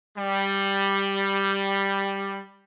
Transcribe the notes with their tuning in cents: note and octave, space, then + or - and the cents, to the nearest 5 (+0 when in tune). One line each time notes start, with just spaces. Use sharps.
G3 +5